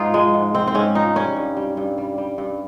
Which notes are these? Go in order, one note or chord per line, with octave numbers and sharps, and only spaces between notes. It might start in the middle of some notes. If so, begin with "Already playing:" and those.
Already playing: G#2 D#4 F4 G#4
F3 G#3
G#2
G#2 C4
C4
G#2 C#4
F3 D#4
G3 C#4
G2
G3
G2
G3
G3
G2